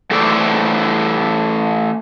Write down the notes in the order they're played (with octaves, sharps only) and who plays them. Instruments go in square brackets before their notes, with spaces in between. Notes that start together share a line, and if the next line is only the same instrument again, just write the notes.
[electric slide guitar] E3 A3 A4 C5 D5